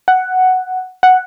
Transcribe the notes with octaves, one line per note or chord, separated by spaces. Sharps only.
F#5
F#5